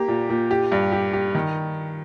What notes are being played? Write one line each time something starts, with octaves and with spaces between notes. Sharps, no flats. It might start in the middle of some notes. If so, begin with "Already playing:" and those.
Already playing: A#3 G4
A#2
A#2
G4
G2
G4
G4
D#3